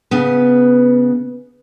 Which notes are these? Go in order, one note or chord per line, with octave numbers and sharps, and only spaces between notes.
C#3 B3